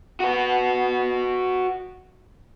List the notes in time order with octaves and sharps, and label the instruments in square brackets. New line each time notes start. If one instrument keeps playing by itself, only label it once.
[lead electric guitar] F#4 B4